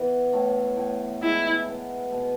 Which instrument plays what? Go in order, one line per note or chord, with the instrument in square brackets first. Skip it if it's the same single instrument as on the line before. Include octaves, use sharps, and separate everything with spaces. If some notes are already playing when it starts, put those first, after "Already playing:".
Already playing: [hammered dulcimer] E3 B3
A2
A2
[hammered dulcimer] G#3 [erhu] E4
[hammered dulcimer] B3
B2